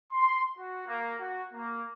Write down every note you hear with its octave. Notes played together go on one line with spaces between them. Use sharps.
C6
F#4
A#3
F#4
A#3